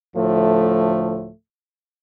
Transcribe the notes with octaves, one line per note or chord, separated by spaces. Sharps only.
D2 A2 F3 A3